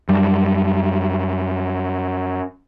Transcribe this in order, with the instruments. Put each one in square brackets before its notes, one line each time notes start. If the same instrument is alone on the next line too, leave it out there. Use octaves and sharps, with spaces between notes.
[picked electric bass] F#2 G3